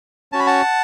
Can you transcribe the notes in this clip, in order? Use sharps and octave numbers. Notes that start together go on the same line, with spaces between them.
C#4 F#4 A5
B5
F#5 A5